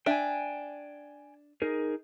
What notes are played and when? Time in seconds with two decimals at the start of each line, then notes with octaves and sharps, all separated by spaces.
0.06 D4 E5 G5 G#5
1.62 D#4 G#4 A#4